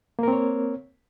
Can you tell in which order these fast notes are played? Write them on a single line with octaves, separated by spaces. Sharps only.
A#3 A#4 C4 C#5